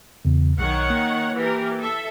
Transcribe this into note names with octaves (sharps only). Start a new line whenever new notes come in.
E2 C#3
B1 D#3 C#5 F#5
A#3
E3 G4 A#4
A4 E5